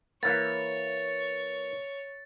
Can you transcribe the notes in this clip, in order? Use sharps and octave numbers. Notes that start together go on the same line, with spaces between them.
E3 A#3 C#5 A6